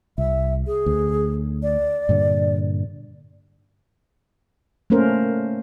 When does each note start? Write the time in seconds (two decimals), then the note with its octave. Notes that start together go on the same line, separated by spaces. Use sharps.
0.18 C2 E5
0.67 G#4
0.86 D2
1.62 D5
2.09 G2 A#2 D3
4.90 A3 A#3 C#4 A#4 C5